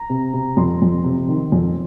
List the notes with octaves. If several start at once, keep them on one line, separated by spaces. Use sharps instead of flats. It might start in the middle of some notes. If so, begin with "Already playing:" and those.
Already playing: A#5
C3
C3
F2 C6
F2
C3
D#3
F2